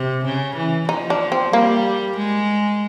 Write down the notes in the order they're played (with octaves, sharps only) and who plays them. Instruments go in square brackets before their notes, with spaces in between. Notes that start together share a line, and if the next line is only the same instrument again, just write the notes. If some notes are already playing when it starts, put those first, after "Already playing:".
Already playing: [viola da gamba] C3
C#3
E3
[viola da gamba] F3 [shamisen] D#4
[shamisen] D4
C4
[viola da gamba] G3 [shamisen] A#3
[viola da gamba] G#3